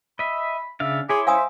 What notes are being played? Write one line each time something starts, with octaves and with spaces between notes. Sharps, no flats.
D#5 E5 B5
C#3 D4 E5 F5
E4 G#4 C#5 C6 D6
C5 E5 F5 G#5 D#6